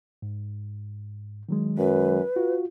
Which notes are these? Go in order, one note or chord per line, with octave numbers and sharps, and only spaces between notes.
G#2
D#3 F#3 G#3
F#2 B4
F4 F#4